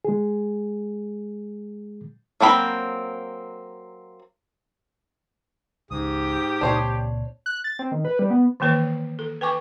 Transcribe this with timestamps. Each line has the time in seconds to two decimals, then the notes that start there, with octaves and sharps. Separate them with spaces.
0.05 G#3 G#4
2.41 F#3 A#3 C4 B5
5.91 C#2 G#2 G4 D#6
6.61 C#2 A#2 C4 D4 C5 C#5
7.46 F#6
7.64 A6
7.79 C4
7.92 D#3
8.05 B4
8.19 G3
8.30 B3
8.60 D#3 E3 A#3 B4 C#5
9.19 A4
9.41 B4 G5 G#5 C#6 D6